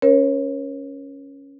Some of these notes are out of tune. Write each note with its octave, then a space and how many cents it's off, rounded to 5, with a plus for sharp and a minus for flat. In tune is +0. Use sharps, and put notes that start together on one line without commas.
C#4 +0 A#4 +35 C#5 -20